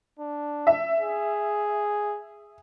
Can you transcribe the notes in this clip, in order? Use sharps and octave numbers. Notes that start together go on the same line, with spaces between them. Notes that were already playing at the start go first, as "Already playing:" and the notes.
D4
E5
G#4